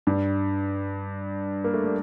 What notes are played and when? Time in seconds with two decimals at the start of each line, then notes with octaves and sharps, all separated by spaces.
0.07 G2 G3
1.64 A#3
1.74 A3
1.84 G3